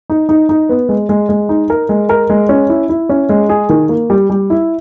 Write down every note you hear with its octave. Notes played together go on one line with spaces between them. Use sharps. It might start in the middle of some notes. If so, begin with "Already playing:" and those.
D#4
D#4
D#4
B3
G#3
G#3
G#3
D#4
A#4
G#3
A#4
G#3
C#4
E4
E4
C#4
G#3
G#4
D#3
A#3
G3
G3
E4